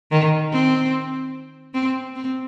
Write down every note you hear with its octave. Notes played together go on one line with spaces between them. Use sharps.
D#3
C4
C4
C4